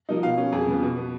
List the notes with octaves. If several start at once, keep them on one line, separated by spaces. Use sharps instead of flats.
F3 A#3 D#4
B2 F5
A#3 C#4
F2 G#4
C#3 F3 B3
B2
F#3 B3